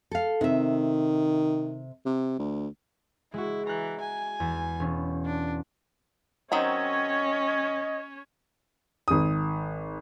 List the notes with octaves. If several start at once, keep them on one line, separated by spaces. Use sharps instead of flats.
A4 F5
C3 D#3 E5
C3
D2
G#3 E4 F#4
E3 A#5 F#6
G#5
E2
E1 C#4
D4
D#3 F#3 C4 C#4 C#5 D#5
G#1 D#6